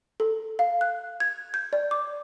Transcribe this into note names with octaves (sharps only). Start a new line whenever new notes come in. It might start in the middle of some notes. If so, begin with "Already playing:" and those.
A4
F5
F#6
G#6
G6
D5
D6